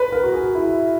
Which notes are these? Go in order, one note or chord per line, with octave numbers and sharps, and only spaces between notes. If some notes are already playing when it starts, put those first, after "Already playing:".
Already playing: B4
A#4
F#4
G#4
E4